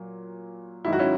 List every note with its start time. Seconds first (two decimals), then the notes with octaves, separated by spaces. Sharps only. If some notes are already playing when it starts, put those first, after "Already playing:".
Already playing: A#2 F#3
0.85 G#2 D#3 F#3 E4
0.93 F#4
0.99 C#4 E4